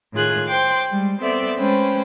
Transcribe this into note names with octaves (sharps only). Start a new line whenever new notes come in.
A2 D#3 F4 G#4 F#6 G#6
C5 G5 C6 D6
G3 G#3
B3 C4 A4 D5 E5
G#3 A3 C#4 B4 C5 G5